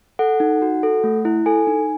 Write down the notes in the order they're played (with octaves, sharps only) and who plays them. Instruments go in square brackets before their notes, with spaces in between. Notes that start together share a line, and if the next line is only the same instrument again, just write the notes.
[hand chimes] A4 F#5
D#4
F#4
A4
A3
E4
A4 G#5
D#4